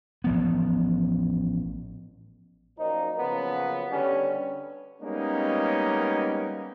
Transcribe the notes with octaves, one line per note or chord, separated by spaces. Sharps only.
A1 F3 B3
F#2 A#2 F3 D#4
C#3 F3 F#3 A#3 B3
D3 G3 B3 C#4
G3 G#3 A#3 B3 C#4 D#4